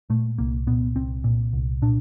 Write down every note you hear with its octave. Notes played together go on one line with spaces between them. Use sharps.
A#2 A3
C2 A#3
A#2 B3
C2 C4
A#2
C2
A#2 D4